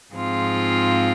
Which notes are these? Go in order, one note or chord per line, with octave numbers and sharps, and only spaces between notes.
G#2 F3 C4 F4 G#4